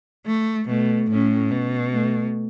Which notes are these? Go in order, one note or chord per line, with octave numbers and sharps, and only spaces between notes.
A3
B2 A3
A2 C#4
B2
A3